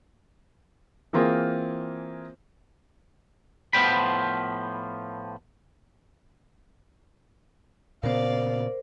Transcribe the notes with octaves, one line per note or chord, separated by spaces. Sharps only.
E3 A#3 C4 F4 G#4 A#4
A2 F3 B3 C5 G5 B5
A#2 C#3 B3 A#4 C5 D5 F5